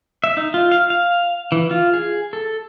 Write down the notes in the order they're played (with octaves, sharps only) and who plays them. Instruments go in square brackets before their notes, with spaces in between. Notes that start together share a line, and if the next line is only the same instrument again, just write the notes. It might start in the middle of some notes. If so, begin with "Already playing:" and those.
[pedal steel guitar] E5
D#4
F4
F5
F5
E3
F4
G#4
A4